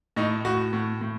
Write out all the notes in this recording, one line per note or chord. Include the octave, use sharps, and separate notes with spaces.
A2 D#4
A2 F#4
A2
A2